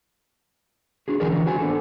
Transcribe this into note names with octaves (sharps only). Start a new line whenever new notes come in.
D4 F#4 G#4
D3 E3 F#3 G#4 A#4 D5
D3 E3 A#4
F#4 C5 G#5
B3 D4 A4